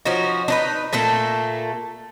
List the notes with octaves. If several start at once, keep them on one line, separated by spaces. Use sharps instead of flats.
F3 C#4 D#4 F#4
D4 D#4 B4
A#2 A3 A#3 A4